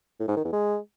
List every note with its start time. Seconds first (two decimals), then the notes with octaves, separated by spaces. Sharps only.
0.20 A2
0.28 G#2
0.36 D#3
0.45 E2
0.53 G#3